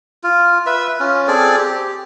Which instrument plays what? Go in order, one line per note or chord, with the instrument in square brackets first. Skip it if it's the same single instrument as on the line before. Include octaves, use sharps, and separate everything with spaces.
[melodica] F4
B4 E5
C#4 F4
C4 G#4 A4 D5
G4